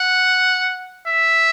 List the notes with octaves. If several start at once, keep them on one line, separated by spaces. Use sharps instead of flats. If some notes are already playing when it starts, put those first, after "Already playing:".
Already playing: F#5
E5